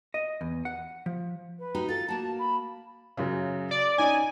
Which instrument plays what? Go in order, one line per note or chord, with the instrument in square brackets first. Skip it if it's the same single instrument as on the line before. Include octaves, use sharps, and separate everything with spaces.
[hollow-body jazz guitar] D#5
E2
F#5
F3
[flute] B4
[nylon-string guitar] D#4 F#4 G4
[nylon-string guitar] F4 A4 [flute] A6
[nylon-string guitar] A#3 F#4 [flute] A5
[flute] B5
[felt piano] F#2 C#3
[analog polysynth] D5
[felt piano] C#4 D#4 [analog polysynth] G#5